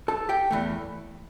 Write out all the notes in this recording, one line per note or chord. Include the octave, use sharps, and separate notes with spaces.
A4 A5
G4 G5
E2 E3 A3